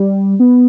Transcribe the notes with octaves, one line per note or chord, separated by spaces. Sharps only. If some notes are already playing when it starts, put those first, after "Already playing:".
Already playing: G3
B3